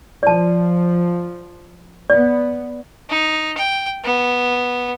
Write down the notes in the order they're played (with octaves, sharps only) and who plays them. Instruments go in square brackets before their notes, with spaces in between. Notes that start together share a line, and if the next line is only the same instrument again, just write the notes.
[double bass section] F3 [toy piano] D5 A5
[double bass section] B3 [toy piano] D5
[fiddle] D#4
G5
B3